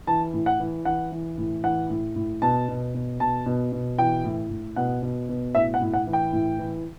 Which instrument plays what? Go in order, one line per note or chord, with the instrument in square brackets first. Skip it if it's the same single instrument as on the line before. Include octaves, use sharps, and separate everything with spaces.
[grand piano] E3 A5
A2
F#5
E3
E3 F#5
E3
A2
E3 F#5
A2
A2
B2 A5
B2
B2
B2 A5
B2
B2
E3 G5
A2
A2
B2 F#5
B2
B2
A2 E5
F#5
A2
F#5
E3
G5
A2
E3